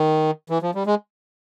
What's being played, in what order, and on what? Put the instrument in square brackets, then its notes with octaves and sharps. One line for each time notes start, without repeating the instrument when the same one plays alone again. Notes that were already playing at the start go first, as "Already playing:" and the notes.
Already playing: [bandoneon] D#3
E3
F3
G3
G#3